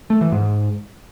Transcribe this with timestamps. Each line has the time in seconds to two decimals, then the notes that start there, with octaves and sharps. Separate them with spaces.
0.10 A3
0.21 E3
0.32 G#2